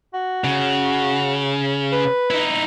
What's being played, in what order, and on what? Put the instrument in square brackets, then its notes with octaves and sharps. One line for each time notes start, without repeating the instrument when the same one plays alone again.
[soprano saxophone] F#4
[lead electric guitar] C#3
[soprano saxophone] B4
[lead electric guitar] D#4 E4